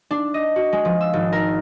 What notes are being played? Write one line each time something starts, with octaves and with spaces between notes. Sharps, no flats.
D4
D#5
F#4
G#3
F3
E6
G#1
A#4